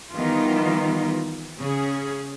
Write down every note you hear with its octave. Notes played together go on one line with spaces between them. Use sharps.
D#3 E3 G3 B3 D#4 F4
C#3 C#4 G#4